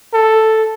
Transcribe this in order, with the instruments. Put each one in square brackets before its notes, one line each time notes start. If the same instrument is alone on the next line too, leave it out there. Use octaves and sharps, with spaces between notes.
[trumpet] A4